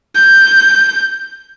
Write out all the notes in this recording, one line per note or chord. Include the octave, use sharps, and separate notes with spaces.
G6